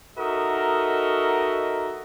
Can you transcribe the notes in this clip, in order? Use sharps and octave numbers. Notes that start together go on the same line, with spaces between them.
D#4 F#4 A4 A#4 D#5 E5